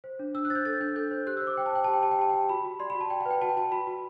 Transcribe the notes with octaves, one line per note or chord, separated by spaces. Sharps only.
C5
D4
D4 E6
F#6
C5 A6
G6
A4 A6
D4 G6
A4 G6
C5
G4 F#6
E6
C5
D6
C5 G5
A5
C5 G5
G4 A5
G5
G4 A5
G5
G4 A5
G4 G5
F#4 B5
F#4
D5 C6
B5
F#4
A5
D5 G5
F#5
B4
G5
F#4 A5
G5
F#4 A5
F#4 B5
F#4